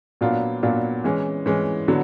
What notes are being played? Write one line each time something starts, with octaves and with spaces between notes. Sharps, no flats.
A#2 F#3 B3 D4 F4
A#2 F#3 B3 D4 F4
E3 G#3 C#4
E3 G#3 C#4
D3 F#3 B3